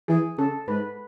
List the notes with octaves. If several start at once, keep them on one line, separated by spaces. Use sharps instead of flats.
E3 G#4
C#3 A4
G#2 B4